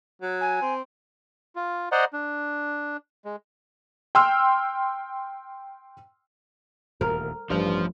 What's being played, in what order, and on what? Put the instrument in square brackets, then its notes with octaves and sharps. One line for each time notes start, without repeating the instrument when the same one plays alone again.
[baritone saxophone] F#3
[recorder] G#5
[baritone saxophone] C4
[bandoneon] F4
C5 D5 D#5 F#5 A#5 C6
D4
G#3
[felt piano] G5 C6 E6 F6
[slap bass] D#1 D2 [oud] A#4
[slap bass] A1 [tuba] G2 [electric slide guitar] F3 C5